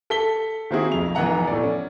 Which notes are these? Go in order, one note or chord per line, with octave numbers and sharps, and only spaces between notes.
A4 B6 G7
D#3 A#3 C4 E4 F#4 G#4
B1 F2 F7
F1 E3 B3 F#5 A#5
A2 D5
C#4